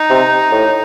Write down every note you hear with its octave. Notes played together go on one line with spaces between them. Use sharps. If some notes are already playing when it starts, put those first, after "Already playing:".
Already playing: D#4
C3
A2